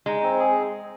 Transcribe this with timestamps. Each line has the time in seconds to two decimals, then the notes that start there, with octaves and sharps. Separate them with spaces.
0.06 G#3 D#4
0.23 C4
0.40 G#4